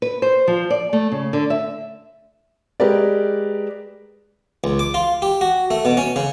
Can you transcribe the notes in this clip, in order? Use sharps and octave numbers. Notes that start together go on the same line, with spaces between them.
B4
C5
F3
D5
A3
C#3
D3
E5
G#3 G4 A#4 B4 D5
C#2
D6
F4
G4
F#4
A3
B2
C#4
C#3